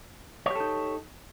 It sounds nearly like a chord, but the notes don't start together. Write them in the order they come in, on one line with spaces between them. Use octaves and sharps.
C#5 G4 A4 D#4